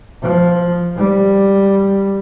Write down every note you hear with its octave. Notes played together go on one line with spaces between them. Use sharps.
F3
G3